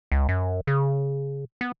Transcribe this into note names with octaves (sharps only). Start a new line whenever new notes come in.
C#2
F#2
C#3
B3